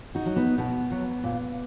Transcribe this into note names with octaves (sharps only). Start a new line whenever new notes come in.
D#4 F#4
F#3
B3 D#4
B2 B3
F#3
A#2